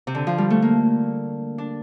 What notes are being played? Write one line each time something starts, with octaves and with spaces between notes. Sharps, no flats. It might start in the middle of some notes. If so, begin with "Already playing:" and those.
C3
D3
F3
G3
A3
A#3
D4